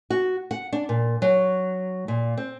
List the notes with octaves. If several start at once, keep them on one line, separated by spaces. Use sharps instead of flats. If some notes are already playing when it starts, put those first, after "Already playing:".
F#4
F#5
D4
A#2
F#3
A#2
C4